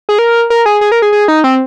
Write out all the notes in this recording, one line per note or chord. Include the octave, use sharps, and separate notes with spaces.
G#4
A#4
A#4
G#4
G#4
A#4
G#4
G#4
D#4
C4